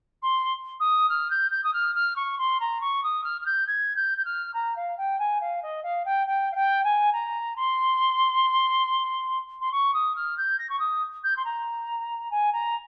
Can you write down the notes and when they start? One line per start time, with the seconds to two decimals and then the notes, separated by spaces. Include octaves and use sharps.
0.22 C6
0.80 D#6
1.09 F6
1.30 G6
1.51 G6
1.63 D#6
1.73 F6
1.95 F6
2.16 C#6
2.38 C6
2.60 A#5
2.81 C#6
3.03 D#6
3.24 F6
3.41 F6
3.45 G6
3.67 G#6
3.96 G6
4.17 G6
4.25 F6
4.53 A#5
4.76 F5
4.97 G5
5.19 G#5
5.40 F5
5.62 D#5
5.83 F5
6.05 G5
6.27 G5
6.52 F5
6.55 G5
6.84 G#5
7.12 A#5
7.56 C6
9.61 C6
9.72 C#6
9.93 D#6
10.15 F6
10.37 G6
10.58 A#6
10.69 C#6
10.79 D#6
11.23 G6
11.36 C6
11.44 A#5
12.31 G#5
12.52 A#5